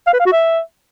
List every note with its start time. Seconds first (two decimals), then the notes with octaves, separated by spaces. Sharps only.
0.07 F5
0.13 B4
0.20 F5
0.26 F#4
0.32 E5